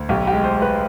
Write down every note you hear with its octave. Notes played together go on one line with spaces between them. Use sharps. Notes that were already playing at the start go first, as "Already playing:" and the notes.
Already playing: D2
B1 G4
G4
G#3
C5
G#3
B4